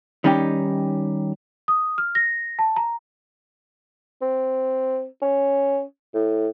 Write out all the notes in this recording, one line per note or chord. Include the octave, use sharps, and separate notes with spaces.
D#3 G3 C#4 D#4 G4
D#6
F6
A#6
A5
A#5
C4
C#4
A2